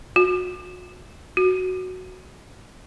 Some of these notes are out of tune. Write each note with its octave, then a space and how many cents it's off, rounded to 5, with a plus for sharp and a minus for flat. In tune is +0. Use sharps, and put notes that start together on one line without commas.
F#4 -30
F#4 +0